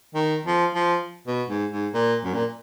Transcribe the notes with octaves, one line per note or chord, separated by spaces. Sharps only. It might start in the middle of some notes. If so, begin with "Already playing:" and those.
D#3
F3
F3
B2
G#2
G#2
A#2
F#2
A#2